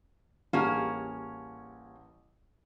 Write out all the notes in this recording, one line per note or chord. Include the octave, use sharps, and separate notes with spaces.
A1 G3 A#3 C#4 G#4 A5